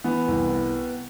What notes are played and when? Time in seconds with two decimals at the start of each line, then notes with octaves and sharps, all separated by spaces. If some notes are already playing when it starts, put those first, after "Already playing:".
0.04 E3 B3
0.28 C2